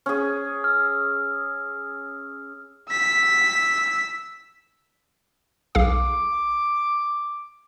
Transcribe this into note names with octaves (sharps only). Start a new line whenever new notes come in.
C#4 G#4
E6 F6
E6 B6
B1 G#4 F5 D6